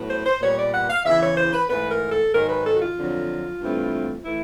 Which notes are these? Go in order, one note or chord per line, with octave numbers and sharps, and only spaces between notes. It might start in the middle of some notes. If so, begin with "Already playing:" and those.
Already playing: A2 F#3 B3
C5
C5
A#2 G3 B3 C#5
D5
F#5
F5
E2 C#3 E3 E5
C#5
C5
B4
G#2 E3 A3 B4
A#4
A4
G#2 D#3 F#3 A#4
B4
A4
F#4
F4
F2 D3 F#3
G2 E3 A3 C4
E3 A3 E4